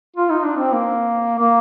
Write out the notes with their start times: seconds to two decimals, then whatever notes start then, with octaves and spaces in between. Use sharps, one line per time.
0.16 F4
0.30 D#4
0.44 D4
0.57 C4
0.73 A#3
1.39 A#3